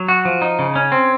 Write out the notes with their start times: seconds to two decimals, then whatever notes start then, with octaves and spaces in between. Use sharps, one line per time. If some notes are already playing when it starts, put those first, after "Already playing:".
Already playing: F#3
0.08 F#4
0.25 F3
0.42 D#4
0.59 C#3
0.76 C#4
0.92 C4